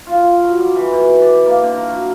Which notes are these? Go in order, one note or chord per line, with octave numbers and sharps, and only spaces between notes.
F4
F#3
G3
E3
B2
D5
A#3
D3
A#4
F#3